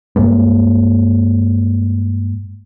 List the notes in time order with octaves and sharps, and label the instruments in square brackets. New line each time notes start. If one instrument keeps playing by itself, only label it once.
[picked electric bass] G2 G#3 A#3 B3